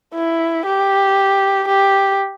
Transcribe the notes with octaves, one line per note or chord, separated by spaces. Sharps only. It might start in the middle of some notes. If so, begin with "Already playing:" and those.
E4
G4
G4